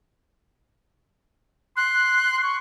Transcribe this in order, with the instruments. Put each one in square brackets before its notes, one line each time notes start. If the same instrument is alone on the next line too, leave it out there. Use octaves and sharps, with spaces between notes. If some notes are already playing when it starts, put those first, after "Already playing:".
[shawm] C6 [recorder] F#6
[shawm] C#6